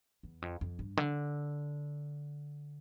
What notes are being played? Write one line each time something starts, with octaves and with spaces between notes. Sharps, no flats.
E2
F2
F2
G2
D3